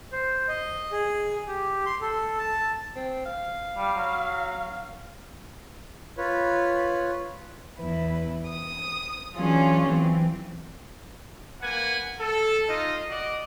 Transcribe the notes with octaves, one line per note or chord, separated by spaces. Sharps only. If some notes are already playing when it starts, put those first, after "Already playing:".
C5
D#5
G#4
G4
C6
A4
A5
C4
F5
G3
F#3
F4 B4 C#5
E2 E4 B4
D#6
E3 F#3 C#4 D4 F4 G#4
E3 C4
A#3 B4 F#5 G#5
A4
D#4 F4 D#5
F#4 D5 D#5